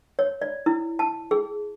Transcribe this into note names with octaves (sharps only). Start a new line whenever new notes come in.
C#5
D5
E4
A5
G#4